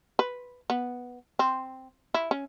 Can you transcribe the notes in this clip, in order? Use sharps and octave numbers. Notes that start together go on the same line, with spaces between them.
B4
B3
C4
E4
C#4